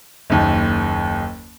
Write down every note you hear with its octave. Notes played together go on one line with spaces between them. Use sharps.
F#1 D#2